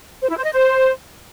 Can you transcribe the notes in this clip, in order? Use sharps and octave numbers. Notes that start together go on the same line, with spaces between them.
C5
E4
C5
D#5
C5